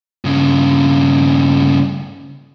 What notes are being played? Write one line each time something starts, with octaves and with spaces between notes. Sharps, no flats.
G2 C#3